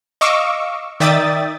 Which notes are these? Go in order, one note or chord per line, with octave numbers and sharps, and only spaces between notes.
D#5 F5 C#6 D6 E6
D#3 D5 E5 G5 D#6 A6